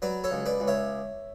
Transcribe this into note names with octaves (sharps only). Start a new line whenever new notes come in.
F#3 B4 D5
A4 C#5
C#2
B4 D5
C#2
C#5 E5